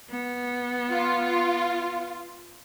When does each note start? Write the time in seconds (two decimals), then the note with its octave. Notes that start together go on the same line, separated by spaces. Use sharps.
0.11 B3
0.90 F4